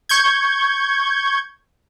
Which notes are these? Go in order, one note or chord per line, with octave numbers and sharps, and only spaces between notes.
C#6 G6 G#6